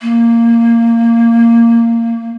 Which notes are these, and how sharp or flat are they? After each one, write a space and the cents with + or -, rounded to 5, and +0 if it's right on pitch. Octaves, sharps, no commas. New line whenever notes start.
A#3 -10